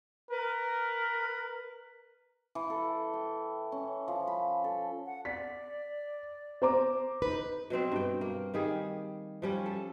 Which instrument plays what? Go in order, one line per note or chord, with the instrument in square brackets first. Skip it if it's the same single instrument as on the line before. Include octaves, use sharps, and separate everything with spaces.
[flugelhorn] A#4 [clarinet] B4
[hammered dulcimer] E3
A4
G5
C#4
F3
B5
A4
[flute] F#5
[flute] D5 [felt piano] B6
[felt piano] C5 A#5 D6
[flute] D#4 [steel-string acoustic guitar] B4
[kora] B2 F#3 C4 C5
G2 G5
A#3
D#3 G3 G#4
F3 G3 C#4
A4